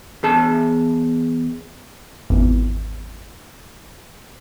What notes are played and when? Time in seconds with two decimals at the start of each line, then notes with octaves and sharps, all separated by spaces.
0.23 E2 G#4 A5
2.30 G#1 E2